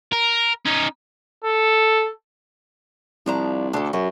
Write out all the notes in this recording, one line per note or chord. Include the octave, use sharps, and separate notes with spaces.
A#4
C#4 D#4
A4
C2 F3 D4 A#5
D2 D4 A4
F#2 F#4